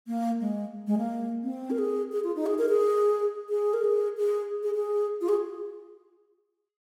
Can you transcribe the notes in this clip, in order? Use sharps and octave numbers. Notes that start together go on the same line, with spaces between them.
A#3
G#3
G#3
A#3
C4
A#4
G#4
G#4
F4
D#4
G#4
A#4
G#4
G#4
A#4
G#4
G#4
G#4
G#4
F4
G#4